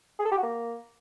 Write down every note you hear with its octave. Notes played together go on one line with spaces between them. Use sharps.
G#4
A4
G4
F#4
A#3